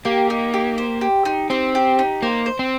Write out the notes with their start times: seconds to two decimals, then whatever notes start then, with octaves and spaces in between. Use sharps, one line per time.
0.05 A#3 G4
0.30 D#4
0.54 G4
0.78 C5
1.01 G4
1.25 D#4
1.50 C4 G4
1.75 G4
1.99 D#4
2.22 A#3 C5
2.46 C5
2.59 C4